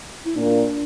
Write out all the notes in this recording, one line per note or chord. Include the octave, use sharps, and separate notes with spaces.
E4
A#2 D4